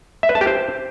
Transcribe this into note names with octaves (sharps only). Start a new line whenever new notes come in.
E5
B4
A5
G4
C5